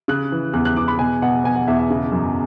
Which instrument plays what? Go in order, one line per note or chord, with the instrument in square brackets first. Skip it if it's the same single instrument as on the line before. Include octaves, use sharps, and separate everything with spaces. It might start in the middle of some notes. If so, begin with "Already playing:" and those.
[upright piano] C#3 F#6
E3
E2 F#6
F#6
E2 D6
B5
B2 G#5
B2 F#5
B2 G#5
F#5
E2 E5
E5
C#3
F#2